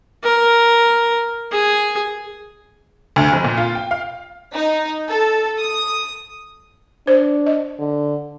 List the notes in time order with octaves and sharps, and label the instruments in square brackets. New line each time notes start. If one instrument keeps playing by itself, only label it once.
[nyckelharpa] A#4
G#4
[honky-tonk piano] D2
F1
A#2
F4
G5
F5
[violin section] D#4
A4
D#6
[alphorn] D4 [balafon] C5
[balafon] D#5
[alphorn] D3